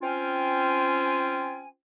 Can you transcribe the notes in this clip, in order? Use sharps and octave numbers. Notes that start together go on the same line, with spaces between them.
C4 C#4 F4 G5 G#5